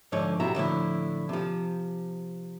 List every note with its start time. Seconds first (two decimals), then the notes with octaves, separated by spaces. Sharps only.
0.12 D2 G#2 D3 F3 C#5
0.40 B1 C3 E4 F#4 E5 A#5
0.55 A2 D3 F3 E4
1.29 C3 F3